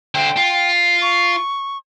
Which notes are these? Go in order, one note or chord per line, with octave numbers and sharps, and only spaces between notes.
D3 C5 G5
F4
C#6